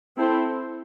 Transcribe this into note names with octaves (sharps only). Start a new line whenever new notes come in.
C4 E4 A4 C5